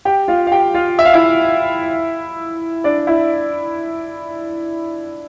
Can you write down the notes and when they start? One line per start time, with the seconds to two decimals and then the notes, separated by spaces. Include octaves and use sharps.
0.05 G4 G5
0.28 F4 F5
0.47 F5
0.52 G4 G5
0.74 F4 F5
0.99 E5
1.05 F5
1.13 E4 E5
2.84 D4 D5
3.07 E4 E5